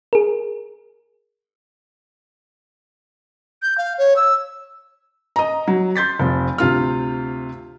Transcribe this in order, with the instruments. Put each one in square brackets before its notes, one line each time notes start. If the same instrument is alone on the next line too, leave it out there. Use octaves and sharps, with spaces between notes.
[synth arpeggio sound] G#4 A#4
[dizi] G6
F5
C#5
E6
[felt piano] D#5 A#5
F#3
C6 G6 A6 B6
F1 F3
D2 C3 F4 F6